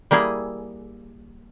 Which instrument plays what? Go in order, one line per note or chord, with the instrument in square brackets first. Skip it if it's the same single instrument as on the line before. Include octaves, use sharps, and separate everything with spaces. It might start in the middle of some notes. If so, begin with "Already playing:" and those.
[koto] G3 A#3 E4 G#4